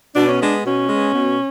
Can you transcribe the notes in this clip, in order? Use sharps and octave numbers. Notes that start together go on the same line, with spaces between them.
B2 D4
C#4
G#3 B3 D4
B2 C#4
G#3 B3
B2